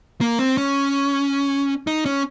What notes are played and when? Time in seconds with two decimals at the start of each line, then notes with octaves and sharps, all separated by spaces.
0.21 A#3
0.39 C4
0.57 C#4
1.87 D#4
2.06 C#4